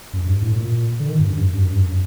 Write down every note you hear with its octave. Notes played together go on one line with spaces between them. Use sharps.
F#2
G2
A2
A#2
D3
D#3
G2
F#2
G2
F#2
G2
F#2
G2
F#2